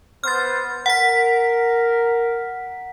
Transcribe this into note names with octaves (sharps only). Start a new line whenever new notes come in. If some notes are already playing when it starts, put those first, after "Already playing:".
B3 C5 F6 A6
A#4 F#5 B6